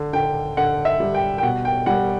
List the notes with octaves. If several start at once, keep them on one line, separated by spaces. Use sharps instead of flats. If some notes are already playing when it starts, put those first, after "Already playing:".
Already playing: D3
D3 G5
D3 F#5
E5
G3
G5
G5
B2 F#5
G5
G3 F#5